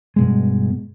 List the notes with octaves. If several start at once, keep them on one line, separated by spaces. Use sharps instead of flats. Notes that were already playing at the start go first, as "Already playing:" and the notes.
G2 B2 G#3